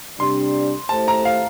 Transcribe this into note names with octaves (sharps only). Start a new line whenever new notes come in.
C3 G3 D4 C6
A3 E4 G4 C5 A5
A#5
F5